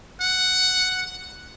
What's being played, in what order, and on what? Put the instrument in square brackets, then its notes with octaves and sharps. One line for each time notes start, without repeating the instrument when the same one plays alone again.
[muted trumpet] F#5